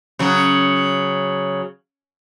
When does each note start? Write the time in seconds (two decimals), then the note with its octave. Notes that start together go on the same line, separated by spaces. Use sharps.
0.19 C#3 F#3